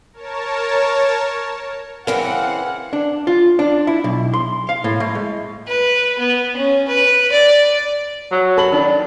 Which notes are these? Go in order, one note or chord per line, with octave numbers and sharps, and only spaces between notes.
A#4 C#5 A5
C#3 E3 C4 A#4 F5 F#5
D4
F4
D4
E4
B1
C6
F5
A2
A3
G#3
B4
B3
C#4
B4
D5
F#3
A4 B5 F#7
D#3 D4